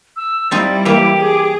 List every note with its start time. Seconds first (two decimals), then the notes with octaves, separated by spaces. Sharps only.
0.16 E6
0.51 F3 G3 C4 D#4 E4 A6
0.85 E3 A#3 G4 D6
1.16 G#4